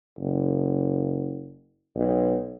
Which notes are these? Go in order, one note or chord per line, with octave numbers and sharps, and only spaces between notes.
F#1
B1